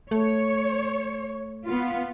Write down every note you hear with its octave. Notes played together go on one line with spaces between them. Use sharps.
A3 C#5
B3 F4